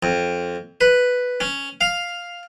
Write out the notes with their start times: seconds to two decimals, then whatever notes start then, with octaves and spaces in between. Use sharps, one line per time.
0.03 F2
0.81 B4
1.40 C#4
1.81 F5